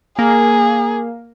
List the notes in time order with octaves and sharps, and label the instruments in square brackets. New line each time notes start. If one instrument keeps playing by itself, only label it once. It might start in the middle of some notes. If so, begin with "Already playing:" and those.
[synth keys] A#3 [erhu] G#4